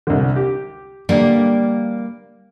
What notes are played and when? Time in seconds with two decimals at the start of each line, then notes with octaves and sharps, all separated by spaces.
0.07 C2 D3
0.36 G4
1.09 G2 D3 G3 A#3